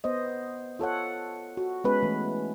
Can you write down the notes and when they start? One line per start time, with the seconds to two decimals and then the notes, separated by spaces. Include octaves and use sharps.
0.04 B3 C5 D#5
0.79 F4 A4 C#5 F#5
1.57 F#4
1.84 G#3 B3 C#4 B4
2.03 E3 A3